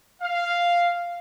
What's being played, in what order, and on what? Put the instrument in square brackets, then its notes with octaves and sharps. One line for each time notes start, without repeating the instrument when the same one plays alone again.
[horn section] F5